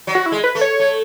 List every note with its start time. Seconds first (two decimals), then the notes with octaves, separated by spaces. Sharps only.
0.07 F#3
0.15 F#4
0.26 E4
0.32 G#3
0.44 B4
0.55 A3
0.61 C#5
0.79 A3